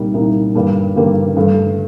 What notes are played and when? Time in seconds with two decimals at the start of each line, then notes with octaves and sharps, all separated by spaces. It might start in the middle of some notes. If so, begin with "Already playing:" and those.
Already playing: C2 A#2 G3 A#3 D#4
0.14 C2 A#2 G3 A#3 D#4
0.55 G2 D3 G3 A#3 D4
0.96 G2 D3 G3 A#3 D4
1.37 G2 D3 A3